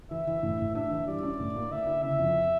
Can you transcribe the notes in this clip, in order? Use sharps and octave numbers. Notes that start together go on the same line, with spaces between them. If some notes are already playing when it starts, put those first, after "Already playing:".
E3 E5
E3
A2
A2
D4 E5
E3
G3 D5
C#4
A2
A#3
D3 E5
E4
C#3 E5
F2